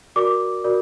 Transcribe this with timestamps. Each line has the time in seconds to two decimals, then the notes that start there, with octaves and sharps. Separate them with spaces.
0.16 F#4 A#4 D5 D6
0.64 F#4 A#4 D5